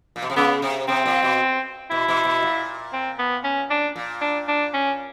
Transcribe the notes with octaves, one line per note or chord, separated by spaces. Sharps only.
A#2
B2
C3
C#3 B3
C3
C3 C4
A#2
B2
B2 E4
B2
B2
A#2
C4
B3
C#4
D4
A#2
D4
D4
C#4